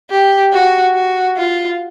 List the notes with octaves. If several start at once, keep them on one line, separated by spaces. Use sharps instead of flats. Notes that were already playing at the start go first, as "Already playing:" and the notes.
G4
F#4
F#4
F4